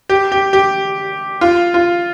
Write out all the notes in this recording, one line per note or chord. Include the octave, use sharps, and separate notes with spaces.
G4
G4
G4
F4
F4